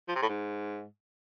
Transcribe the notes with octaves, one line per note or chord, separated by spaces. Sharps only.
F3
C3
A2
G#2